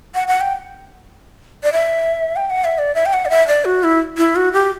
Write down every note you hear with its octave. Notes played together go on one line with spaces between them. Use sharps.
F#5
F#5
G5
D5
E5
G5
F#5
E5
D5
E5
G5
F#5
D5
E5
D5
F#4
E4
E4
F#4
G4